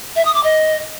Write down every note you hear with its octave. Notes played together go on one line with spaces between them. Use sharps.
E5
D#6
D6
D#5